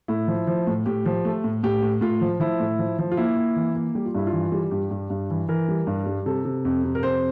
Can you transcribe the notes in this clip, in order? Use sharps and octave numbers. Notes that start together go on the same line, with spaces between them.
A2 E4
F3
F3
A2
A2 G4
F3
A3
A2
A2 G4
A2
A2 F4
F3
F3 E4
A2
F3
F3
F4
A#3 E4
A#3
E3
A#3
G3 G4
F4
G2 E4
F4
E3
G3
G2 G4
G2
G2
E3
E3 A#4
G3
G2
G3
C3 A4
C3
F2
C3
A#4
F2 C5